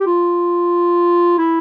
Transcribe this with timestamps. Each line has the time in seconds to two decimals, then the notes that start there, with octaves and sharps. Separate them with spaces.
0.01 G4
0.06 F4
1.38 E4